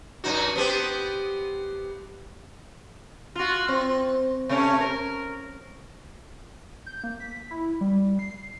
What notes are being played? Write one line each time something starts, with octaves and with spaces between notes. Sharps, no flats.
F#2 D#4 F#4
B3 C4 G4
F4 F#4
C4
C3 A3 C#4
A#4
G6
A#3
B6
E4
G3
C7